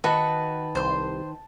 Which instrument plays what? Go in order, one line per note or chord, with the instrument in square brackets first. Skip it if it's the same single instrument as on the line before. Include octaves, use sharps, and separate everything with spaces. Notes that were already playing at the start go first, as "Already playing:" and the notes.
[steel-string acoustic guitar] D#3 B4 [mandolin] F#4 [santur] A5
[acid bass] C2 [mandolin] C5 C6